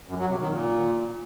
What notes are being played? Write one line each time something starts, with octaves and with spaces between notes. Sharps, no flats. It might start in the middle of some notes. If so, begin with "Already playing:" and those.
F#2
F#3
C3
D#3
A#2